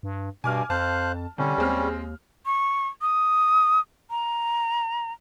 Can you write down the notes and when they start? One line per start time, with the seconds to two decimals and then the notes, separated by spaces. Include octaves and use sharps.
0.03 G2
0.44 G2 B2 G#5 D6 F6
0.70 F2 C5 F5 A5 F#6
1.38 C2 D3 G3 C#4
1.58 D#2 G#3 C4 F6
2.46 C#6
3.02 D#6
4.10 A#5